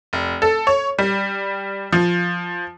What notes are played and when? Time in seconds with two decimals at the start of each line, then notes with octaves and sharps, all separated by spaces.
0.13 F1
0.42 A4
0.67 C#5
0.99 G3
1.92 F3